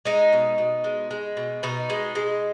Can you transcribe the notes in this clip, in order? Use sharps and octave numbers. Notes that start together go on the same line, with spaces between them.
G#3 D#4
B2
B2
G#3
G#3
B2
B2 D#4
G#3
G#3